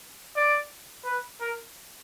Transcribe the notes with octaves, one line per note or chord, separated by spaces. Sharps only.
D5
B4
A#4